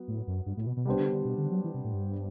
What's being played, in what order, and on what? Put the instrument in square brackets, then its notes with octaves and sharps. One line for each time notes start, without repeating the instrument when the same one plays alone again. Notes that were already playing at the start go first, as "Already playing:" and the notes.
Already playing: [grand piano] F#3 B3
[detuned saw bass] A2
F#2
G2
A2
B2
B2
[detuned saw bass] C3 [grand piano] G3 B3 D4 G4 C5
[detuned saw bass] D3
D3
B2
D3
F#3
E3
C3
A2
G2